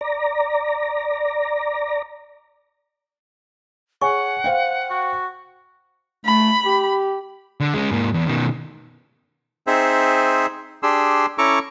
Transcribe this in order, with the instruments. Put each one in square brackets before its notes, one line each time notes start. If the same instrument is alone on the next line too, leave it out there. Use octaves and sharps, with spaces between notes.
[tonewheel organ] D5 A#5
[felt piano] G#4 C#5 G#5 [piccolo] F#5 [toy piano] C#6
[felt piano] C5 F5 G5
[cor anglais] F#4
[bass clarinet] A3 [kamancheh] B5
[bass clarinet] G4
[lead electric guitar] D3
G#3 C#4
G#2 A#3
E2
B2 D#3
[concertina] C4 D#4 G#4 C5 E5
D4 G4 G#4 C6 E6
C#4 E4 A4 A#5 C#6 D6